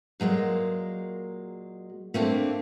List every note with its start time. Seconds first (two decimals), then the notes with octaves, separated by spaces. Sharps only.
0.20 A#2 F#3 G#3 A#3
2.14 A3 A#3 C4 D4